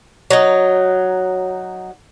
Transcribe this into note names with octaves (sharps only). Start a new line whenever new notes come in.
F#3 D#4